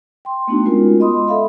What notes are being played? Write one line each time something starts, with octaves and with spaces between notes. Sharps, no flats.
G5 C6
A3 B3 D4 D#4 F#4
G#3 B3 C#4 F4 A#4
D#5 B5 C6 D#6
A4 E5 F5 B5